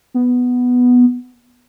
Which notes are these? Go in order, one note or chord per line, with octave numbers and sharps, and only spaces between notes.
B3